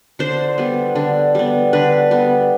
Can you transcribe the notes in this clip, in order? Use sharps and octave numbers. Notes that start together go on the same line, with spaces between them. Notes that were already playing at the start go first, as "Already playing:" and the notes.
D3 C5
G3 B3
D3
G3 B3
D3 B4
G3 B3